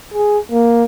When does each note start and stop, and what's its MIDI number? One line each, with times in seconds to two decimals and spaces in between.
0.14 0.38 68
0.52 0.84 58